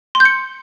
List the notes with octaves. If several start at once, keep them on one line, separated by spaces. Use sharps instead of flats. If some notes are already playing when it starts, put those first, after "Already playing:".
C6
G6
C#7